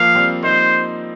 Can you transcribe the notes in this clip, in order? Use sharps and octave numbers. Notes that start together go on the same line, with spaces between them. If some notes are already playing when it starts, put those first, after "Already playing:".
Already playing: F3 A#3 F5
G3 C4
A#3 D#4 C5